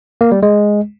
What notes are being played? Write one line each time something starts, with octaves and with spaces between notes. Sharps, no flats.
A#3
G3
G#3